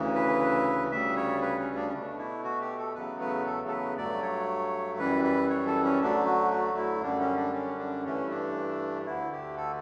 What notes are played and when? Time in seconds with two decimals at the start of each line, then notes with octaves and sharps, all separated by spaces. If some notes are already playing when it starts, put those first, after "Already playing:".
Already playing: D2 C#3 E3
0.15 B4
0.91 D2 C#3 G3 E5
1.17 C#5
1.42 B4
1.59 C#4
1.76 D4
1.88 C#4
1.93 B2 A3 D4
2.18 E4
2.44 F#4
2.61 G4
2.78 A4
2.95 E2 C#3 F#3 A3 B4
3.21 B4
3.46 A4
3.67 A4
3.71 B4
3.97 G2 F#3 A3 D5
4.23 C#5
4.99 F#2 E3 G3 B4
5.24 B4
5.50 C#5
5.66 A4
5.84 C#4
6.01 D2 D3 F#3 A3 D4
6.26 F#4
6.51 F#4
6.77 E4
7.02 F#2 D3 G3 D4
7.19 C#4
7.37 D4
7.53 C#4
7.79 D4
8.05 G2 E3 A3 C#4
8.30 D4
9.06 D2 D3 A3 E4
9.32 G4
9.57 A4